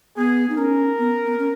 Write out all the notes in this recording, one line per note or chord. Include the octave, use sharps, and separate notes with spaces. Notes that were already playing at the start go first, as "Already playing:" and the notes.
B3 G#4
D#4
C#4 A#4
B3
B3
C#4